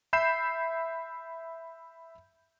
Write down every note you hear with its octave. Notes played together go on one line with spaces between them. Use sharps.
E5 B5 G6 C7 E7